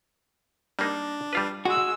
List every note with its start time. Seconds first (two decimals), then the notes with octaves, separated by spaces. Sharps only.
0.79 G3 A#3 D4 D#4
1.33 G3 F4 B4
1.65 G#3 F#4 E6